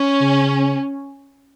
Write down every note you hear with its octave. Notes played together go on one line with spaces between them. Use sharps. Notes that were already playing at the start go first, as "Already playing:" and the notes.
Already playing: C#4
C#3